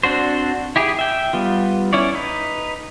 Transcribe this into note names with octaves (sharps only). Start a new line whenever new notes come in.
C4 D4 F#4 C5
E4 G4 G#4
E5 G5
G3 B3 F4
C#4 E4 C#5 D5
D#4 B4